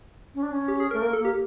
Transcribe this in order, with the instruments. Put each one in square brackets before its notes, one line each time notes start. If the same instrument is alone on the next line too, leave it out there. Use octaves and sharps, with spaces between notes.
[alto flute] C#4
D4
C#4
[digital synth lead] G4
G#4
[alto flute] A3 [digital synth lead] A#4
[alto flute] A#3 [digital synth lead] A#4
[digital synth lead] A4
[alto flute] A#3
[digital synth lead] G4